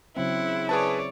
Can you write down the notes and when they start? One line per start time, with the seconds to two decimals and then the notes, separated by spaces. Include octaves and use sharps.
0.16 C#3 F#3 C4 E4 F#5
0.69 G#4 B4 C#5 D5 A5